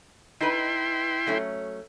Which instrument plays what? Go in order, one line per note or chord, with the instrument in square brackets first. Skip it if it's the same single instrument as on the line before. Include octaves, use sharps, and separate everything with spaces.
[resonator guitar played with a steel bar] D#4 B4 [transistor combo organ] E4 G5 C6
[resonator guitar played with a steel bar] F#3 A3 C#4